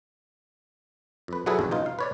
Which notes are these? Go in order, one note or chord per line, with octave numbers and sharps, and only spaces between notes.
F2 B4
F#3 E4 F#4 G#4 A4 B4
A1 E2 G2
B2 D#4 F4
F5
B4 C#5 D5